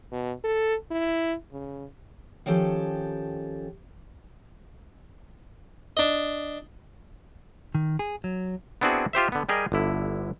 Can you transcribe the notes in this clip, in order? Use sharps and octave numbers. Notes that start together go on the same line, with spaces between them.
B2
A4
E4
C#3
D#3 F3 C#4 G4 A4
D4 D#5
D#3
G#4
F#3
B3 C4 D4 E4 F#4 G#4
F4 G4 C5 E5
D3 B3
G3 G4 G#4 A#4 D#5
G1 D3 E4